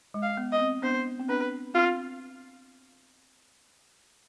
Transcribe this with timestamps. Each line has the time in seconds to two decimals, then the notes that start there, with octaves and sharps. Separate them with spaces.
0.14 G#3
0.22 F5
0.37 B3
0.52 D#5
0.60 C4
0.82 B3 D4 C5
1.20 C4
1.29 B3 D4 B4
1.74 C4 F4